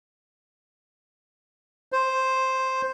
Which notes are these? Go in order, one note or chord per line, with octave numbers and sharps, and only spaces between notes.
C5